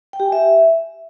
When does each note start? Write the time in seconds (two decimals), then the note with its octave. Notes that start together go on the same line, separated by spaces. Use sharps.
0.13 G5
0.20 G4
0.26 G#5
0.32 E5